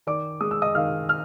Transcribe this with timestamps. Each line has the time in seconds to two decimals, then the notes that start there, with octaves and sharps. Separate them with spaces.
0.07 D#3 D5 D6
0.41 G#3 D#6
0.51 E6
0.62 D#5 D#6
0.75 D#3 F5 F6
1.09 F6